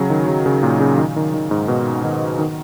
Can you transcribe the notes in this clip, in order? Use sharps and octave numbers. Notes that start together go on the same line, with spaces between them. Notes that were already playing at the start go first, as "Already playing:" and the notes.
Already playing: C#3 F#3
D#3
C#3
C#3
A#2
C#3
D#3
D#3
D#3
G#2
B2
D#3
D#3